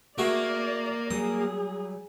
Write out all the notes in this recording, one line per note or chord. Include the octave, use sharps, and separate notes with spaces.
A3 A#3 F#4 G#4 D5
F#3 G3 G#4 D#6